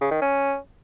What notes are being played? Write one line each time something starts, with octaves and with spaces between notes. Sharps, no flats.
C#3
D#3
C#4